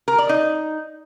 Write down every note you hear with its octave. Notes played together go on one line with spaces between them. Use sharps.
A#4
D5
D#4